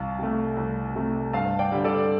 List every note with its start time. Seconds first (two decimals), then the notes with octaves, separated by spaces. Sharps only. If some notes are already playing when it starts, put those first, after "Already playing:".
Already playing: C2 F5 A5
0.19 C3 A3
0.57 C2
0.95 C3 A3
1.33 G2 F5 A5
1.59 D5 G5
1.72 D3 G3
1.84 A4 D5